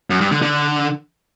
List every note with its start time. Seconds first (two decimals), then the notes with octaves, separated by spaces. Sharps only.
0.10 F#2
0.21 G2
0.31 D3
0.42 D3